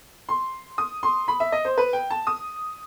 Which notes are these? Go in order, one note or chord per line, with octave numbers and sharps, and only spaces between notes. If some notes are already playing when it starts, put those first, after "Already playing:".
C6
D#6
C6
B5
E5
D#5
C5
B4
G5
A5
D#6